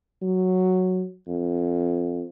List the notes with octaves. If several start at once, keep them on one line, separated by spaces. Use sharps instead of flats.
F#3
F2